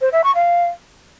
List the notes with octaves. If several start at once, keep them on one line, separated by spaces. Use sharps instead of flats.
C5
E5
C#6
F5